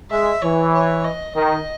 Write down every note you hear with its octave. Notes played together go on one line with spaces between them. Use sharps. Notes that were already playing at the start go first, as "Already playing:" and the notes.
G#3 E5
E3 C#5
C#5
D#5
D#3 D#5